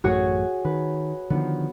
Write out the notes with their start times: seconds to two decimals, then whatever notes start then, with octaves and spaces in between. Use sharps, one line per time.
0.04 A1 F#2 A3 F#4 G#4 C#5
0.65 D#3 B4
1.30 D3 D#3 F3 B3